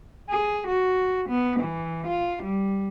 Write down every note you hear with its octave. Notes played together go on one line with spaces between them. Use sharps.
G#4
F#4
B3
E3
F4
G3